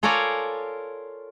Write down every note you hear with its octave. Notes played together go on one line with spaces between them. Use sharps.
F4 A4 A#4 C#5 D5 G#5